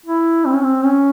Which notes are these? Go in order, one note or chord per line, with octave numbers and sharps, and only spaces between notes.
E4
C4
C#4
C4
C#4